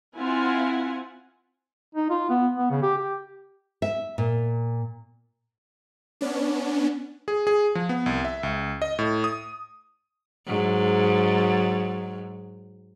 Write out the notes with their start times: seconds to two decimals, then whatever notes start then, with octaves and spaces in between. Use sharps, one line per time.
0.17 C4 E4 F4 F#5 G#5
1.95 D#4
2.10 F4
2.30 B3
2.57 B3
2.71 C#3
2.82 G4
2.98 G4
3.82 E5
4.18 A#2
6.21 B3 C#4 D4
7.28 G#4
7.47 G#4
7.75 F3
7.89 B3
8.06 C2
8.25 E5
8.43 C#2
8.82 D#5
8.99 A2
9.24 D#6
10.46 G#2 F#3